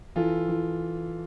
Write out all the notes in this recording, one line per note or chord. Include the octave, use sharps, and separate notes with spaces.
E3 F4 A4
E3